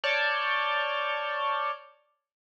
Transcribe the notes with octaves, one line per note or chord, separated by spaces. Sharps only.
C#5 D5 A5 C#6 F6 G6